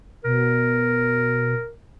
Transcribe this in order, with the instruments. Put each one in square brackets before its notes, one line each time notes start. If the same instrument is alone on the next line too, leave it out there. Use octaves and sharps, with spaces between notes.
[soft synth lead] B2 [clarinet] A#4